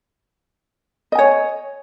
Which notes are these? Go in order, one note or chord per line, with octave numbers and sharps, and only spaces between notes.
C#5 D#5 G#5